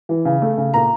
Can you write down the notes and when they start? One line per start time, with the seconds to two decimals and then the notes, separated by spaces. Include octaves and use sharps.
0.09 E3
0.25 C#3
0.42 A3
0.58 C#3
0.74 A#2 A#5